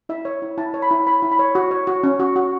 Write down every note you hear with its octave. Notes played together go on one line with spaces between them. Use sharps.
E4 E5
C#5
E4
E4 A5
C#5
B5
E4
C#5 B5
E4
B5
C#5
F#4
C#5
F#4
C#4
F#4
F#4